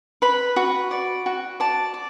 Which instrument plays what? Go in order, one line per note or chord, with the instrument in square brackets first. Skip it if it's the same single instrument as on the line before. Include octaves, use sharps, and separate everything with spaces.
[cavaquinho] B4 B5
F#4
D5
F#4
D5 A5
D5